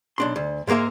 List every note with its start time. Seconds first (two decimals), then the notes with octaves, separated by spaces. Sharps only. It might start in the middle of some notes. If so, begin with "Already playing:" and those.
0.18 B1 D4 C6
0.36 D2
0.67 G#2 G#3 A#3 A#4 E5